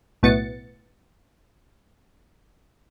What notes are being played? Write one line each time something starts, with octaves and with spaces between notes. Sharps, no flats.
B1 A2 B3 A6 C#7